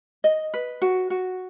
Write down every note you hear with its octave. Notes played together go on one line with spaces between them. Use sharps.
D#5
B4
F#4
F#4